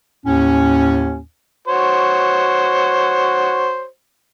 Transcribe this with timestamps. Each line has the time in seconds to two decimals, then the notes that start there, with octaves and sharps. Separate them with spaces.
0.24 D#2 A2 C#4
1.68 F#4 C5 C#5